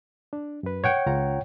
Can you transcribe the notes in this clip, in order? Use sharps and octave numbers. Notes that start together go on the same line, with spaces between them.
D4
F#2 B4
C#5 F#5 G5
C#2 F4 A#5